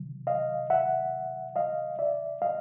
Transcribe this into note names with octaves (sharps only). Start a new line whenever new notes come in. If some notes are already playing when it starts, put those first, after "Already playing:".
Already playing: C3 D#3 F#3
D#5 F5
E5 F#5
D#5 F5
D5 E5
D#5 F5